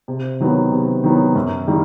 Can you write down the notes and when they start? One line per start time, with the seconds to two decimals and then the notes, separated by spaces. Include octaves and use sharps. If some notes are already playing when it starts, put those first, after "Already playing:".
0.08 C3
0.40 D#3 F#3 B3
0.72 C3
1.04 D#3 F#3 B3
1.36 F#2
1.67 D#3 G3 A#3